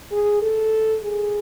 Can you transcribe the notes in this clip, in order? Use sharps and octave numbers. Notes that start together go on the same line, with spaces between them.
G#4
A4
G#4